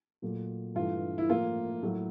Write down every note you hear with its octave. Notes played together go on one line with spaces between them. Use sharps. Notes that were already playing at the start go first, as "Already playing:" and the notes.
A#2 F#3 A3
G2 E3 A3 F4
E4
A2 F3 A#3 F4
A2 F#3 A3